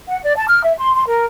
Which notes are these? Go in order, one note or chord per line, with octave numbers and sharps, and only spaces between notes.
F#5
D5
A5
F6
E5
C6
C6
A#4